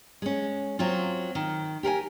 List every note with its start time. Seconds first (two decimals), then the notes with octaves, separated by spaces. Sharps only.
0.22 G#3 C#4
0.79 F#3 C4 F4
1.35 D#3
1.83 G4 A#4 F5 G#5